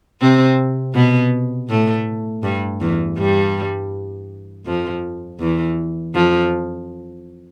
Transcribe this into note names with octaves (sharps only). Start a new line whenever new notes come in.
C3 C4
B2 B3
A2 A3
G2 G3
E2 E3
G2 G3
F2 F3
E2 E3
F2 F3